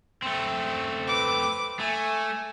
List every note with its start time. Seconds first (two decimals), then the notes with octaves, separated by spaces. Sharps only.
0.22 A3 C4
1.08 B4 D6
1.80 A3 G#5